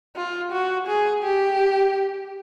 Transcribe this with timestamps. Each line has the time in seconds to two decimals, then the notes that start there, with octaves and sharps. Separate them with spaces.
0.16 F4
0.52 F#4
0.88 G#4
1.24 G4